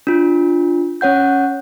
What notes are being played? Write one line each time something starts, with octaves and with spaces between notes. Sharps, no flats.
D4 F4
C#4 C#5 F#5 G6